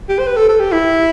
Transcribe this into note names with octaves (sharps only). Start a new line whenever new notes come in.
G4
C5
B4
A4
A4
G4
E4